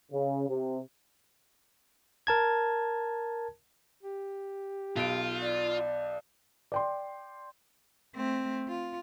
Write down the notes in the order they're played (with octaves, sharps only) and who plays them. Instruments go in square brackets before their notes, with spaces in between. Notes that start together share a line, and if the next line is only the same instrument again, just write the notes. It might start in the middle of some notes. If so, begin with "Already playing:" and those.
[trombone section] C#3
C3
[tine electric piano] A#4 A5 G#6
[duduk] G4
[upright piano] B1 D7 [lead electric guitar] F4
[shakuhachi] D5
[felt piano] D5 G5 C6
[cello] A3 C4
F4